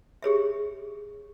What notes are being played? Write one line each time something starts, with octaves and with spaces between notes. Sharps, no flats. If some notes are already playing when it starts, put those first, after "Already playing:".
G4 G#4 C#5 E5